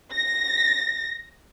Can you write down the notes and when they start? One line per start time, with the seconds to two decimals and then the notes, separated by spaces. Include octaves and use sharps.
0.14 A#6